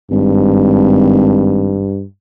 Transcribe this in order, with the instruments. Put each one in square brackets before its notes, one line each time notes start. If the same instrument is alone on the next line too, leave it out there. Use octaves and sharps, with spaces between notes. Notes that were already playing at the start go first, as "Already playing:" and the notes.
[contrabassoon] G#1 [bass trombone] G2